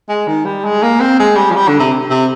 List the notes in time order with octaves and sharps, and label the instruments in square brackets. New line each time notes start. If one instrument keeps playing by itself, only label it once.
[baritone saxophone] G#3
D#3
G3
G#3
A#3
C4
G#3
G3
F3
G3
D3
C3
C3